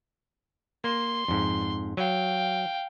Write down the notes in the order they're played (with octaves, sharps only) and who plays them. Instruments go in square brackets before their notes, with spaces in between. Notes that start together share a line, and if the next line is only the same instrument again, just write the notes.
[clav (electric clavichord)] A#3 [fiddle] C6
[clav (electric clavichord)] F2 G#2
[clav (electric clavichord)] F#3 [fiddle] F5 G5